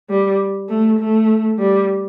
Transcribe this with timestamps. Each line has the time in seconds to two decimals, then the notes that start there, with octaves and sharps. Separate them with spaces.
0.10 G3
0.69 A3
0.99 A3
1.59 G3